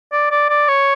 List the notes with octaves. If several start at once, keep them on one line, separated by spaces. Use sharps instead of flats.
D5
D5
D5
C#5